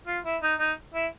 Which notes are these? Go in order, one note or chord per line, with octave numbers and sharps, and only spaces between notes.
F4
E4
D#4
D#4
E4